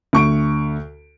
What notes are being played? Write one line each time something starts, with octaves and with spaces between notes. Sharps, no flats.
D2 C#6 D7